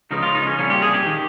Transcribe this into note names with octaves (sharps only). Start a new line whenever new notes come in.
C#2 C#3 F3 D#4
F4
D#4
C#4
C2 A#2 F3 C#4
G4
G#4
G4
D#3